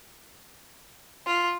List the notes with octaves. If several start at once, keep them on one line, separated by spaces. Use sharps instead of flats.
F4